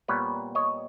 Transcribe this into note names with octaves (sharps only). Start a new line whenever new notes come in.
A#2 G3 B3 B4 C#5
C#5 D#5